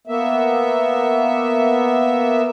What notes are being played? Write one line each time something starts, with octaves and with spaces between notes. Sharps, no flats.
A#3 B3 E5